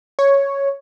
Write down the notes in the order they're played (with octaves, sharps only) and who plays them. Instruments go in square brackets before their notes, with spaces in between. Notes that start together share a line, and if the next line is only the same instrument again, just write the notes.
[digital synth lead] C#5